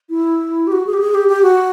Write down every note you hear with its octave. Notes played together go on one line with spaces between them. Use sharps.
E4
G4
F#4
G#4
G4
G#4
G4
G4
F#4